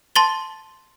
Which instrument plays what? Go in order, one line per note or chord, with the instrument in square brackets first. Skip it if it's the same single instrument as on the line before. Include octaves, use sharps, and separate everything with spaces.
[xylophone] A5 C6 A6 G7